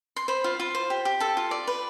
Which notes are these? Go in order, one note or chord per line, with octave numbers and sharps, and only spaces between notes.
C6
C5 B5
F4
F4
C5
G4
G4
A4 A5
F4
D5
B4